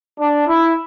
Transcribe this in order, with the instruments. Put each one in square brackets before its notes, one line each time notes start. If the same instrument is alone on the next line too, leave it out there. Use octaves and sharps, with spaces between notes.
[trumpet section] D4
E4